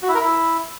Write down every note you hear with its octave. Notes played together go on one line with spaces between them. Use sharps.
F#4
E4
A#4
E4